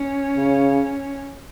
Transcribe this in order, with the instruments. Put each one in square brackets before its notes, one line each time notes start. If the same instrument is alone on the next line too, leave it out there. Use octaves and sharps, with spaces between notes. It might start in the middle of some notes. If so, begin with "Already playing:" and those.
Already playing: [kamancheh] C#4
[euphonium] C#3